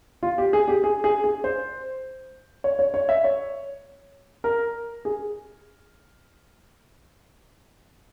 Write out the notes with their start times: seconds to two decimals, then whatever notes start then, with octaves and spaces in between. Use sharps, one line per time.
0.23 F4
0.38 G4
0.53 G#4
0.68 G4
0.84 G#4
1.04 G#4
1.24 G#4
1.44 C5
2.64 C#5
2.79 C#5
2.94 C#5
3.09 E5
3.24 C#5
4.44 A#4
5.05 G#4